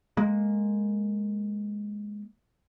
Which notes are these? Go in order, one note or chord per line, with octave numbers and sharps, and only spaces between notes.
G#3 A#3